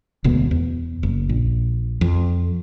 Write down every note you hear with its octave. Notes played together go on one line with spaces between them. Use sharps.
E1 D2 B2 B3
E2
F#1
A#1
F2